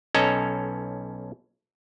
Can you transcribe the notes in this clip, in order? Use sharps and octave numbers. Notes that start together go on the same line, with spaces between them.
B1 C#4 A4 D#5 A#5